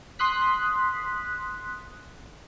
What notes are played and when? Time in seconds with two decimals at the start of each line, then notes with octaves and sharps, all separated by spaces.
0.19 C6 D#6 F#6 B6